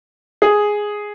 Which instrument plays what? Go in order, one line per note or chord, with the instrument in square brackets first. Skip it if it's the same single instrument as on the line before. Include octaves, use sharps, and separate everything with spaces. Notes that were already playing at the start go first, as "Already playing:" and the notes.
[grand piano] G#4